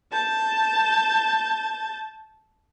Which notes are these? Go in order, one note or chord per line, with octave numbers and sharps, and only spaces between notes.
A5 G6 A6